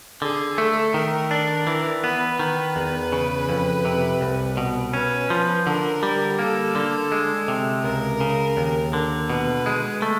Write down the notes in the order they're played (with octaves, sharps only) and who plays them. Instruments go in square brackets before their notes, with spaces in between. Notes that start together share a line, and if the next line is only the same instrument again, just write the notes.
[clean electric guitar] D3 [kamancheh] G#4
[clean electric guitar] A3 [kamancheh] A4
[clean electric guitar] D#3 [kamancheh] A#4
[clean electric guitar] D4
E3
[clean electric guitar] B3 [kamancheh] B4
[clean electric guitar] D#3
E2
C#3
F2
C3
C2
B2
[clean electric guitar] C#4 [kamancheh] B4
[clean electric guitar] F3
[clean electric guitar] D3 [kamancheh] A#4
[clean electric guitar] G3
[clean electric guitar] A#3 [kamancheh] A4
[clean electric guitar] D3
G#3
C3
[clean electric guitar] C#2 [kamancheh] A#4
[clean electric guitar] C#3
D#2
D3
[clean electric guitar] B2 [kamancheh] B4
[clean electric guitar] G#3
A3